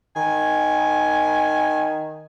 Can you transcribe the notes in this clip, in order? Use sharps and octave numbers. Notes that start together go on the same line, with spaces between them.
D#3 G#5